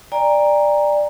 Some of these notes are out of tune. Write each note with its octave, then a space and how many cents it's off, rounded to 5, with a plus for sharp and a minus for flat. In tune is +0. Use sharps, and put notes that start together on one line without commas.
D5 +10 G5 +45 A#5 +0